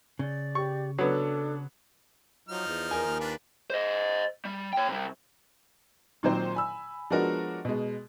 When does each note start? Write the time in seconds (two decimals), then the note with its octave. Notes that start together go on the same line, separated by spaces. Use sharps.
0.19 C#3 D5
0.55 G4 C#6
0.99 F#3 B3 D4 A4
2.48 F3 F#3 D#4 F6
2.67 E2
2.91 A#4 G#5
3.06 D#2
3.20 D4 F4 B4
3.70 C5 D#5
4.45 G3
4.73 C#5 G5
4.88 C3 G3
6.23 A#2 D#3 F#3 C4 C5
6.55 G#5 B5 E6
7.10 F3 G#3 B3 D4 F#4 A#4
7.65 B2 G#3